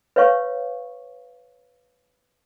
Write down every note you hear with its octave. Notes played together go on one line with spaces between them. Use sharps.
B4 C#5 F5 C#6